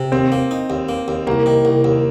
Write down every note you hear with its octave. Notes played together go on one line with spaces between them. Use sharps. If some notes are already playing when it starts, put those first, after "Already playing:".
Already playing: C3
D#2 C4
A#3
D#4
D#2
A#3
D#2
C2 A#3
D#3
C2
D#2